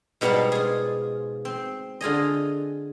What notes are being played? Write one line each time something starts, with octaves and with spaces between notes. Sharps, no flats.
G#2 B2 G3 F5 F#5 A5
F4 G#4
C4
D3 F4 G#4 D#5